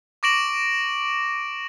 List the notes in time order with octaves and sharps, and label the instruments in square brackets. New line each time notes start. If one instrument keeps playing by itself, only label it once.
[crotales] C#6 D6 A#6 D7 E7 F#7